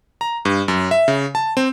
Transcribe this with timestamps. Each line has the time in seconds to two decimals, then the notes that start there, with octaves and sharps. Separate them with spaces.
0.21 A#5
0.45 G2
0.68 F#2
0.91 E5
1.08 C#3
1.35 A5
1.57 C4